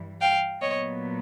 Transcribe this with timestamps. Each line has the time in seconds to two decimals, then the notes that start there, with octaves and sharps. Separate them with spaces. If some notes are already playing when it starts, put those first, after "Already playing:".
Already playing: G2 E3 G3
0.21 F5 G5
0.62 A#2 F#3 B3 C#5 D#5